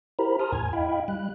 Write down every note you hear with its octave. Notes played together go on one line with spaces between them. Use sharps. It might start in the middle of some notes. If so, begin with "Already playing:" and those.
E4 G4 A#4 C5 A#5 B5
A5 A#5 C6 D#6 F6
E2 A2 G#5 G#6
E4 D#5 F5 G5 B5
G3 F#6